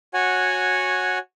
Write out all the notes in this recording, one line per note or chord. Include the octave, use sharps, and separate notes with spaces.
F#4 C#5 F#5 G#5